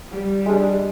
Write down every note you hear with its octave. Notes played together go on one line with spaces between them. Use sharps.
G3
G#3 D4